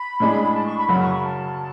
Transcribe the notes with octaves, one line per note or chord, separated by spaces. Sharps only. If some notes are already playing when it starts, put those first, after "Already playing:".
Already playing: B5
A2 G#3 D4 G#4
A5
C#6
B5
F#2 C#3 F#3 B5
C#6
B5
A5